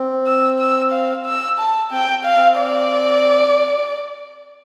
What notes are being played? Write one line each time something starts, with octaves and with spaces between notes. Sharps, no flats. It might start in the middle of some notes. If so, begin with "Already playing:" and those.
Already playing: C4
E6
E6
F5
E6
A5
C4 G5
F5
C4
D5